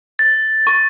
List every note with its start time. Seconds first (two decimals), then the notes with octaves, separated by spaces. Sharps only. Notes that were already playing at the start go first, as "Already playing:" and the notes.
0.19 A6
0.67 C#6